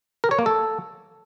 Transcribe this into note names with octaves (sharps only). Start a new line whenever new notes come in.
A#4
C#5
A#3
A4